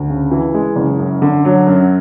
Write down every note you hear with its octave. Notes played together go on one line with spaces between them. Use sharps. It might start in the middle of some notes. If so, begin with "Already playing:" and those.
Already playing: D2
C#3
E3
G#3
F#1
F#2
D3
F#3
F#2